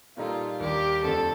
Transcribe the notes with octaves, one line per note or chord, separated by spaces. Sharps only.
A#2 G3 A#3 D#4 F4 A4
D#2 D#3 G3 A#3 D4 G4
F2 D3 A3 C4 A4